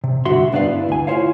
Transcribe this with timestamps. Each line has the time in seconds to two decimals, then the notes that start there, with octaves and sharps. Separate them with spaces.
0.04 C3
0.25 G2 D3 F#4 E5 C6
0.52 G2 B3 D4 G4 B4 F5
0.68 E4
0.89 D2 G#5
1.07 E4 F4 G4 C5 C#5 F5